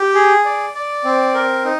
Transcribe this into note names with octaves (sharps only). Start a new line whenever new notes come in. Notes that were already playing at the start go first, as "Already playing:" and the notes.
Already playing: G4
G#4
D5
D5
C4
A#4
D#4